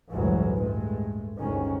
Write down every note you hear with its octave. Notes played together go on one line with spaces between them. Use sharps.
A1 D2 G2 E3 F#3 G#3
G2 G#3 A3
G1 D2 C3 D#3 G#3 C#4